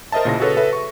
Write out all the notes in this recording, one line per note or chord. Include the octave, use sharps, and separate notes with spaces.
A#4 C5 D#5 E5 A5
A#2 C#3 E4 A#6
F#4 G#4 A4 B4 C#5
A4 B4 E5
C#6